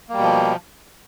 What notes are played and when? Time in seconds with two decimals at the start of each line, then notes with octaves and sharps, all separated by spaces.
0.09 A#3
0.13 G3
0.18 B2
0.22 F3